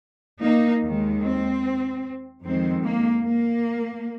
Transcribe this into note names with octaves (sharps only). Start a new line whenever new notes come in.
A#3 D#4
D#2 D#3 G#3
C4
F2 D#3 G#3 C4
A#3
A#3